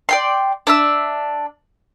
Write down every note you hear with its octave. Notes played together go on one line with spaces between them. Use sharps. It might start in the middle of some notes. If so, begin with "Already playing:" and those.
D5 G5 C6
D4 E5 E6